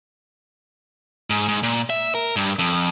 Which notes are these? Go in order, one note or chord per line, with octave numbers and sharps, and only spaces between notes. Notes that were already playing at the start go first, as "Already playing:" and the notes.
G#2
G#2
A#2
E5
A#4
G2
F2